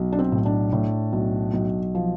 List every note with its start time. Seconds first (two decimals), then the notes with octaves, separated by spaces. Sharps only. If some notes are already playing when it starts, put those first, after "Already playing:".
Already playing: B1
0.12 D4
0.19 C4
0.32 A2
0.45 D4
0.72 A2
1.13 B1
1.54 B1
1.95 F3